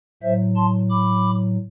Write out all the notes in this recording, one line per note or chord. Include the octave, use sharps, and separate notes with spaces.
A2 F#3 C5 E5
A5 C6
B5 D6